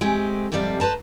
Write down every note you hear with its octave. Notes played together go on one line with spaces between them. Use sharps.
G#3 A3 C4 G4
F2 G#2 C3 G3 A4 F5
B4 C5 A5 A#5